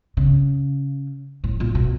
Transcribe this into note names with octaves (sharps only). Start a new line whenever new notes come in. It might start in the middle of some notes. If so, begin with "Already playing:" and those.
C#3
A2
A#2
B2